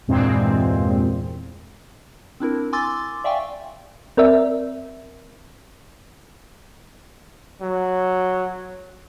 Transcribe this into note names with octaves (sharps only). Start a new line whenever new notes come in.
E2 G2 A#2 G#3 C4
C4 D4 E4 A#4
G#5 C6 D6 E6 A6
D5 E5 F5 G5 G#5 C#6
C4 A#4 D5 E5
F#3